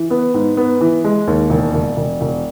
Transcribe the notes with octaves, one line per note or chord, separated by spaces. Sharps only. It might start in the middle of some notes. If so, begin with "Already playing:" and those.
Already playing: E3
B3
G#2
B3
E3
G#3
D#2
E1
E1
E1
E1